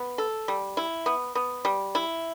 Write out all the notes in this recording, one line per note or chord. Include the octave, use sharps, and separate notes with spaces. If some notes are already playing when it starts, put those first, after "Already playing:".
Already playing: B3
A4
G3
E4
B3
B3
G3
E4